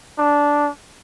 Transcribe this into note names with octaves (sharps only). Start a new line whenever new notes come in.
D4